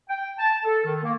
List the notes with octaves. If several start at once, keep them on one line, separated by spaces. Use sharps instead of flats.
G5
A5
A4
D#3
A#3